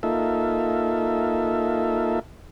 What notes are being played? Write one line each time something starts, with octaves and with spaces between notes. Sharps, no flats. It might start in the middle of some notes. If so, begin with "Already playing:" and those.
A#3 D#4 F4 A4 E5